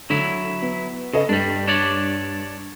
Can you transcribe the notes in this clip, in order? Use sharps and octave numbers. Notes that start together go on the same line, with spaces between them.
D3 F#3 E4
B3
C#3 A4 B4 D#5
G2 G3 D4
D4 C#5 D5